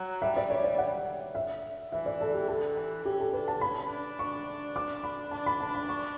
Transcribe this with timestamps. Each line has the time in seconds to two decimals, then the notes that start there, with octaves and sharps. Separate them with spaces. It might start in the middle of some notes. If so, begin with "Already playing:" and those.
Already playing: F#3
0.22 G3 E5
0.37 D5
0.50 C#5
0.64 D5
0.78 F#5
1.35 E5
1.92 E3 E5
2.06 D5
2.21 A4
2.34 G4
2.48 D3 A4
2.77 E3
3.05 C#4 G4
3.20 A4
3.33 D4 B4
3.48 A5
3.61 C#4 B5
3.90 D4
4.19 C#6
4.76 D6
5.04 B5
5.31 D4 A5
5.46 B5
5.60 A5
5.75 B5
5.89 C#6